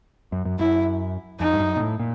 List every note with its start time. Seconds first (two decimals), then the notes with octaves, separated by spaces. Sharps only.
0.32 F#2
0.45 F#2
0.59 F#2 E4
1.40 F2 D#4
1.54 G2
1.60 F#2
1.76 A#2
1.80 A2
1.99 A#2